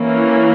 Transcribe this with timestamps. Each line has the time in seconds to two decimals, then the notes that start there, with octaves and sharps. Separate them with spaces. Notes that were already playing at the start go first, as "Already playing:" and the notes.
Already playing: E3 A#3 C#4